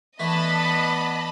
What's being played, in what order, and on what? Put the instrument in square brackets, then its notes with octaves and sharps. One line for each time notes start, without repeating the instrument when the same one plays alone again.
[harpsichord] E3 A3 [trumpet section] B3 D5 [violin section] D#5 A5 B5 [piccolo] B6